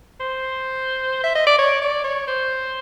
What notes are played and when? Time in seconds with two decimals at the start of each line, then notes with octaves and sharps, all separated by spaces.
0.20 C5
1.24 E5
1.35 D#5
1.47 D5
1.59 C#5
1.82 D5
2.04 C#5
2.27 C5